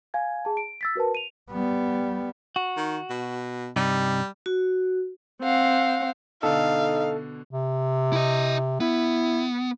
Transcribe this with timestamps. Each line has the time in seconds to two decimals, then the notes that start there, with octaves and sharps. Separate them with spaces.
0.14 F5 G#5 G#6
0.45 G#4 A5
0.57 D7
0.81 E6 A6 B6
0.96 F#4 A#4 B4 A5
1.15 D#7 F7
1.51 G3 B3
2.56 F#4
2.77 D#3
3.10 B2
3.76 G2 C3 G3 D#4
4.46 F#4
5.42 C4 F5 F#5
6.43 B2 D3 D#4 A4 F5
7.51 C3
8.13 E4 D#5
8.80 B3 E4